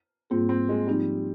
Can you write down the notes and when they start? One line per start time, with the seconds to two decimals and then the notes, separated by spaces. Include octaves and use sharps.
0.30 G#2 G3 A#3 C4 F4 G#4
0.49 C4
0.69 G#3
0.87 F3 G3 C4 D#4 G4